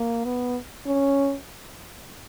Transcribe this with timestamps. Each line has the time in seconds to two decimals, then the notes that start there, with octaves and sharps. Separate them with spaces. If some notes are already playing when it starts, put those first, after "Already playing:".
Already playing: A#3
0.24 B3
0.87 C#4